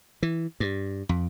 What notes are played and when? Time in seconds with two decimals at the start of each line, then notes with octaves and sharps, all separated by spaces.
0.23 E3
0.60 G2
1.09 F2